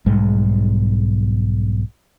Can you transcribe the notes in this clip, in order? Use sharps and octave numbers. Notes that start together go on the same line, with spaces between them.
B1 G#2 G3 G#3